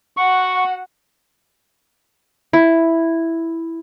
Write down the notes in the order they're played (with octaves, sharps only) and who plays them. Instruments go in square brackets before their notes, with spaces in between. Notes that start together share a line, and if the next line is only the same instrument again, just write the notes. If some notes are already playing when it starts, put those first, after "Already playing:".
[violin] F#4 F#5 [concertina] C#6
[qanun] E4